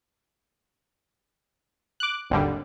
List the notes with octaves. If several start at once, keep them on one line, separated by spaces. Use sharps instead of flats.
D6 F#6
G#1 D#2 D3 G3